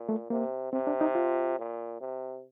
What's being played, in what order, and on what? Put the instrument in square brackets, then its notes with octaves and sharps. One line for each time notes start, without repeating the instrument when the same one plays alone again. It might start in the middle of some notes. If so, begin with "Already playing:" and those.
Already playing: [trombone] A#2
[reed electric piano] A3
[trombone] C3 [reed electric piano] A#3
[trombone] C3 [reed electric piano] C4
[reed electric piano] D4
D#4
F4
[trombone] A#2
C3